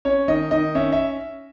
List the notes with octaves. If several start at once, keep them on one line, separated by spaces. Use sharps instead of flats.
C#4 C#5
D#3 D#5
D#3 D#5
C#4 E5
E5